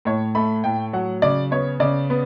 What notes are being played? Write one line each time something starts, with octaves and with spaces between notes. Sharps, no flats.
A2 C#5
A3 B5
A2 G5
F#3 F#5
C#3 D5
B3 C#5
C#3 D5
B3